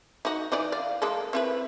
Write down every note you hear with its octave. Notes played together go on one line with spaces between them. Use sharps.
D#4 F#4
E3 D#4 D5
D5 F5
G#3 A#3 A4
C4 E4 B4